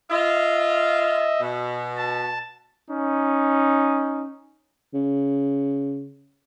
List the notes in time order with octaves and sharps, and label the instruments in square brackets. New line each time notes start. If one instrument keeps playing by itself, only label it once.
[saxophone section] F4 [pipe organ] D#5 E5
[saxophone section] B2
[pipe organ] A5
[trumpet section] C#4 D#4
[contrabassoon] C#3